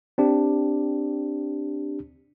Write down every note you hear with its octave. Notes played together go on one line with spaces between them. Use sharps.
C4 D4 G4